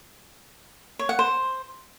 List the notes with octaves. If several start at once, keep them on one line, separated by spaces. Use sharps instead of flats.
C#5
F#5
C5